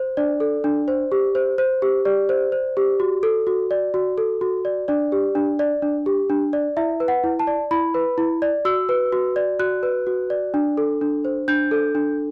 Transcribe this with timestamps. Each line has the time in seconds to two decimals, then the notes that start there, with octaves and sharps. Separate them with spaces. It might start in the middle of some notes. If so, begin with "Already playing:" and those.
Already playing: C5
0.17 D4 D5
0.40 A4
0.64 D4
0.88 C5
1.12 G4
1.35 C5
1.58 C5
1.82 G4
2.05 G4 D5
2.29 C5
2.52 C5
2.77 G4
3.00 F#4
3.23 A4
3.47 F#4
3.71 D5
3.94 F#4
4.18 A4
4.41 F#4
4.65 D5
4.88 D4 D5
5.12 G4
5.35 D4
5.59 D5
5.82 D4
6.06 G4
6.30 D4
6.53 D5
6.77 E4 E5
7.00 B4
7.08 F#5
7.24 E4
7.39 A5
7.47 D5
7.71 E4 B5
7.94 B4
8.18 E4
8.42 D5
8.65 F#4 E6
8.89 B4
9.13 F#4
9.36 D5
9.59 F#4 F#6
9.83 B4
10.07 F#4
10.30 D5
10.54 D4
10.77 A4
11.01 D4
11.25 C5
11.48 D4 G6
11.71 A4
11.95 D4